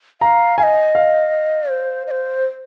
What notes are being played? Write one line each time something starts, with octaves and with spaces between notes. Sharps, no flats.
F5 A#5
F5 G#5
D#5
F5
C5
D#5
C5